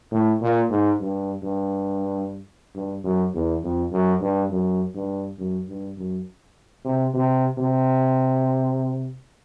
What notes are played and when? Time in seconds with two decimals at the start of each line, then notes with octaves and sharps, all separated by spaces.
0.12 A2
0.41 A#2
0.70 G#2
1.00 G2
1.43 G2
2.75 G2
3.04 F#2
3.34 E2
3.63 F2
3.92 F#2
4.21 G2
4.50 F#2
4.95 G2
5.39 F#2
5.68 G2
5.97 F#2
6.85 C3
7.14 C3
7.58 C3